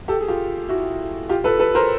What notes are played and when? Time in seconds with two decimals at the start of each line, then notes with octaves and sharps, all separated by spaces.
0.08 G4 A4
0.21 G#4
0.28 F4 G4
0.69 E4 F#4
1.29 F4 G4
1.44 A4 B4
1.59 A4 B4
1.75 A#4 C5